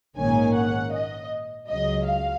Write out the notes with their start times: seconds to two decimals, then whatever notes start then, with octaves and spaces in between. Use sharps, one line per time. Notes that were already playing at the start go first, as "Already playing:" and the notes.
0.16 A#1 G#2 D#3 A#3 C#4 G#5
0.55 F#5
0.92 D#5
1.68 C#2 C#3 F#3 D#5
2.05 F5